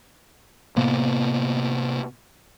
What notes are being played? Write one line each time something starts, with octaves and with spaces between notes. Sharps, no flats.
A2 C3 A#3 B3